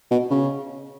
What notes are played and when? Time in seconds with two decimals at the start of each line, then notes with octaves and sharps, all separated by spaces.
0.11 B2
0.31 C#3